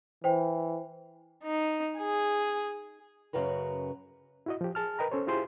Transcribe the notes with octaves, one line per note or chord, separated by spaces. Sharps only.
E3 C5 G5
D#4
G#4
F#2 C#3 F#4 B4 A#5
E4 F#4 D#5
F3 G4
G#4 A5 F6
A#4 B4 D#5 G5 A#5
C#4 A4 C5 C#5
E4 F4 G4 G#4 C5 C6